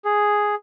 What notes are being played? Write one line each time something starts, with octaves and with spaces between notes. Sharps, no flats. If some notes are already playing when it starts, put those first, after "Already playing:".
G#4